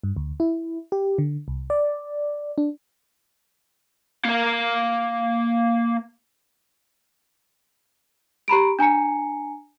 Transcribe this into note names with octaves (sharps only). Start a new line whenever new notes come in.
G2
D2
E4
G4
D3
C2
D5
D4
A#3 F5
G4 A#5 B5 D7
D4 G#5 A#5 C#7